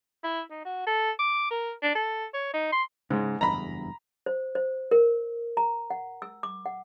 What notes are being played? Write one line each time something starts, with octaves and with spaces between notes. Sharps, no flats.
E4
D#4
F#4
A4
D6
A#4
D4
A4
C#5
D#4
C6
G#2 C#3 G#3
F#1 E2 G2 A#5 B5
C5
C5
A#4
A#5
F#5
E6
D6
F#5